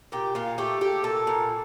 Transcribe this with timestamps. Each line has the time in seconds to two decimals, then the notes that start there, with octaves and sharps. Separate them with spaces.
0.12 A#2 G4
0.35 A#2 F4
0.58 A3 G4
0.81 A3 G4
1.04 A#2 A4
1.27 A#2